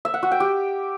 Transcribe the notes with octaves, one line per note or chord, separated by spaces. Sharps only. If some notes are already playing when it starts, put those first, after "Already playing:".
E5
F#5
F#4
G5
G4